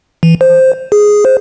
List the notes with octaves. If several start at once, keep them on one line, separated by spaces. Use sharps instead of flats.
E3
C5
G#4
C5